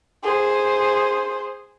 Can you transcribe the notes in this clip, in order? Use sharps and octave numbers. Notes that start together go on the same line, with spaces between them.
G#4 C5